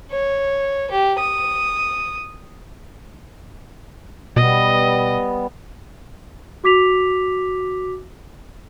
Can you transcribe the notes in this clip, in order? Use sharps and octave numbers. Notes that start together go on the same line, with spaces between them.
C#5
G4
D#6
B2 G3 B3 D#5
F#4 D6 B6 F7